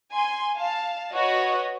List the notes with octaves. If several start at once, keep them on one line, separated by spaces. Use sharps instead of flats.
G#5 C6
F5 A5
F#4 B4 C#5 D#5